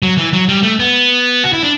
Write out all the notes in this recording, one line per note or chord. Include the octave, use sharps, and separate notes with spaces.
F#3
E3
F#3
G3
A3
B3
F#4
E4
D4